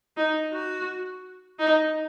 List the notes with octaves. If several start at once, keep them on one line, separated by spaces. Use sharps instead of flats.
D#4
F#4
D#4